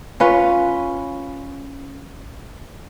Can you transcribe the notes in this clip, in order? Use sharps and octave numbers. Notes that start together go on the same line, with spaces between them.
C#4 F4 B4